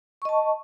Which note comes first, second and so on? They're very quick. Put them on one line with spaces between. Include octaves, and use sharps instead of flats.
C#6 D#5 A5